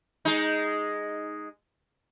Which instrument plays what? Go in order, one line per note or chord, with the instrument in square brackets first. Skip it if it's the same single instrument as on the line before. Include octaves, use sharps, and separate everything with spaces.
[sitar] G#3 D#4